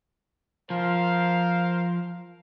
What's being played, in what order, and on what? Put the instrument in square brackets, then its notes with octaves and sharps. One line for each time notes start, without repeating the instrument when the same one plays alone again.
[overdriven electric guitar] F3 [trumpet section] A#4 C5 F5